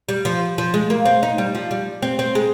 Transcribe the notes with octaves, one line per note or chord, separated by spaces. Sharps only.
G3
F3
F3
G#3
A#3
C4
D#4
G3
F3
G3
C4
C4
G#3